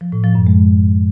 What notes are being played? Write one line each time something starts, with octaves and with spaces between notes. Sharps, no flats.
F3
A2
F3
F#2
G#3